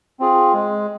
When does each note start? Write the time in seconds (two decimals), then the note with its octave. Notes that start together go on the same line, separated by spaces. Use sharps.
0.20 C4 F4 G#4
0.53 G#3